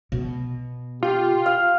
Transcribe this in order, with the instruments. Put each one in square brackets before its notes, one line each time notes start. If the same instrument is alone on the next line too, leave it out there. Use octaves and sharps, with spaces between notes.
[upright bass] B2
[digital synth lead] F4 [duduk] G4
[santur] F5